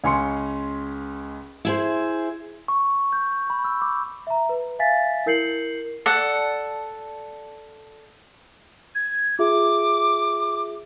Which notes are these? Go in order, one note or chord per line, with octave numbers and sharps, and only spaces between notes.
C#2 C#4 C6 C#7
E4 G#4 C5
C#6
G6
B5
E6
D6
E5 A#5
B4
E5 F5 G#5 A6 B6
E4 A#4 G6 C7 C#7 F#7
A4 D5 F#5
G#6
F4 G#4 E5 D6